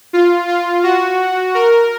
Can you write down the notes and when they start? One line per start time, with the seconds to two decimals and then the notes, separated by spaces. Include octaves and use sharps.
0.13 F4
0.48 F4
0.84 F#4
1.54 A#4